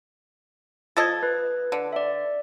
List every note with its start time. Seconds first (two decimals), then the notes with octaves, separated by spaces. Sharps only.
0.97 F3 A4 D#5 G#6 A6
1.23 B4
1.72 D3
1.93 D5 E5